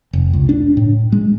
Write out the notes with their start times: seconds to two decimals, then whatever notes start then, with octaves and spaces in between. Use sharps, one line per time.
0.13 F1
0.33 C#2
0.49 D4
0.77 A2
1.12 G#3